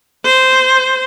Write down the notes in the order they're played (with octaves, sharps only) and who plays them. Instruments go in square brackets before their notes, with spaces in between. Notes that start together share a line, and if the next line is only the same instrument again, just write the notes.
[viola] C5